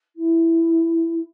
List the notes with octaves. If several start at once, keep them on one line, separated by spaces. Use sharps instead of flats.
E4